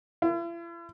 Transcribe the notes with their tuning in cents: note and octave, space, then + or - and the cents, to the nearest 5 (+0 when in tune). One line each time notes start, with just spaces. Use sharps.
E4 +45